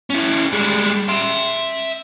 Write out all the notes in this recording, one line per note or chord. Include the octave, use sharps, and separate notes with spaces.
C#4 E4
G3 G#3
E5 C6